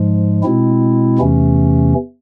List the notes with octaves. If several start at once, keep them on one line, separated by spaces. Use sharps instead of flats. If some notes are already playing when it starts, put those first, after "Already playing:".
Already playing: G#2 F3 G#3
B2 G#3 C4 E4
E2 C3 E3 A3 C#4